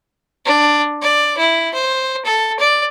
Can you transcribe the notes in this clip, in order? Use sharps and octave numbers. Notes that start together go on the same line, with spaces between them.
D4
D5
E4
C5
A4
D5